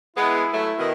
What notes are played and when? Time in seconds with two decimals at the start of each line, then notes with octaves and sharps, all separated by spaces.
0.16 G#3 B3 E4
0.53 F#3 A3
0.78 B2 D#3